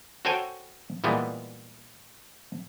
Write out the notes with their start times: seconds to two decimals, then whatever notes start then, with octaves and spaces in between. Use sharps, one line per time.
0.25 F#4 A4 C5 C#5 G5 G#5
1.04 A#2 E3 G3 G#3 B3